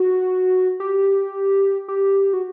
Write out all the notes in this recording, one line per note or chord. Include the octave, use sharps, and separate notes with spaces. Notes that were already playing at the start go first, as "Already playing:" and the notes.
Already playing: F#4
G4
G4
F#4